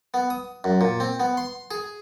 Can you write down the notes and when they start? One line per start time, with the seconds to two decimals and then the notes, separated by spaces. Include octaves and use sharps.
0.14 B3
0.30 D#6
0.64 F#2
0.81 A#2
1.00 C4
1.20 B3
1.37 C6
1.71 G#4